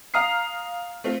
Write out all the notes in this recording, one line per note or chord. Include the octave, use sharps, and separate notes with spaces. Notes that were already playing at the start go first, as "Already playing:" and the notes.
F5 A#5 D#6 F6 C7
A3 C4 F4